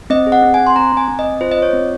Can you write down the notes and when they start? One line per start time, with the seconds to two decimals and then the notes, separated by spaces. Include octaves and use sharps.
0.10 C4 D#5
0.27 G#4
0.32 F#5
0.43 C4
0.54 G#5
0.59 C4
0.67 C6
0.76 C4 A#5
0.92 C4 G#5
1.08 C4
1.19 D#5
1.24 C4
1.41 F4 C5
1.52 D#5
1.58 F4 C#5
1.73 C4